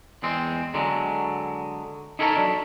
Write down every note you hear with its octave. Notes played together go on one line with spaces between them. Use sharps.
E2 G#3 C4
D3 F#3 G#3
D#4 E4 A4 A#4 C#5
F#3 D4